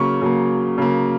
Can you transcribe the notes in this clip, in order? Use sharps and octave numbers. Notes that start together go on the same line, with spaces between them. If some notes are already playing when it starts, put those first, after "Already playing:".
Already playing: C#3 F#3 A#3 C#6
C#3 F#3 A#3
C#3 F#3 A#3